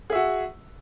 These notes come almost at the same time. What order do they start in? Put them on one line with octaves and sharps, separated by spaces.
G#4 E5 F#4